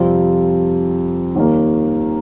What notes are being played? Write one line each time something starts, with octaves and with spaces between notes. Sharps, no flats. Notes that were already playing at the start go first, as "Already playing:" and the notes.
Already playing: F2 C3 G3 C4 F4
D#2 D#3 G3 A#3